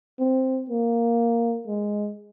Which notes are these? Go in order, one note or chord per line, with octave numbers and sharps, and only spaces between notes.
C4
A#3
G#3